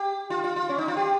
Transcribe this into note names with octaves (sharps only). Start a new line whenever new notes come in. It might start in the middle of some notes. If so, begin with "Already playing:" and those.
Already playing: G4
F4
F4
F4
C#4
D#4
F4
G4